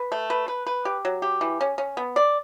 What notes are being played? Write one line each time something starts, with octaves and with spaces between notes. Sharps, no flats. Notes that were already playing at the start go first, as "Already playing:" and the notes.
Already playing: B4
A3
B4
B4
B4
G4
F#3
G4
E3
C#4
C#4
B3
D5